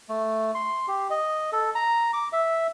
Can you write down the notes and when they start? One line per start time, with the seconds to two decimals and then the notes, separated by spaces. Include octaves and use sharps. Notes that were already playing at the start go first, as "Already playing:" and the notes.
0.09 A3
0.54 C6
0.88 G4
1.10 D#5
1.52 A4
1.75 A#5
2.13 D6
2.33 E5